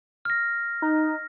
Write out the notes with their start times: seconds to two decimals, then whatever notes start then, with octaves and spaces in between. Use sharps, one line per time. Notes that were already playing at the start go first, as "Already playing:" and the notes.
0.25 F6 A#6
0.82 D#4